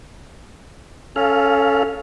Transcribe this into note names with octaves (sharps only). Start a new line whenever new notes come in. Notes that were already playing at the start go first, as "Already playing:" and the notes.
C#4 A4 F5